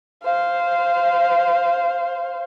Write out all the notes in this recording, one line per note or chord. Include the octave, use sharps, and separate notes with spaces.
C5 F5